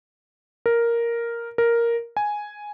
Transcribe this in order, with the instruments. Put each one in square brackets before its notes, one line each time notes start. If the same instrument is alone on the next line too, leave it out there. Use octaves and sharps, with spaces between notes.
[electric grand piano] A#4
A#4
G#5